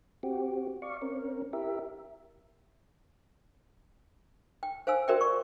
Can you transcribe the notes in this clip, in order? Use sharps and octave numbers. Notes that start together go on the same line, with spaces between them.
C4 F#4 G4
D5 F5 C#6
C4 C#4 A#4
E4 G4 A#4 E5
G5
C5 F5 G#5 E6
F#4 A#4 C5 D5 E5 G5
D5 C#6